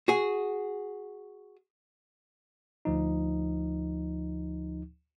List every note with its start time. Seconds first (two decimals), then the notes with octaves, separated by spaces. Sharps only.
0.08 F#4 G#4
2.85 D2 F3 D#4